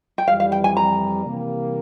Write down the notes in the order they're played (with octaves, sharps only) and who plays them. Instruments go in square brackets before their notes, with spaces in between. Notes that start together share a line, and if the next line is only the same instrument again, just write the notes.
[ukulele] G5
[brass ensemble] F2 E3 G3 [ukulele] F5
[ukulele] F5
G5
G#5
A#5
[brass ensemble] C3 E3 G3 A#3